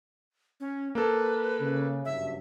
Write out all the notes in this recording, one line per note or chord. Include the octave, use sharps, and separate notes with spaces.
C#4
A#3 A4 B4
C#3
F#1 G2 F#3 E5